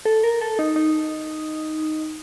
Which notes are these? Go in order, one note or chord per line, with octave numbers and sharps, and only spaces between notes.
A4
A#4
A4
D#4
D#4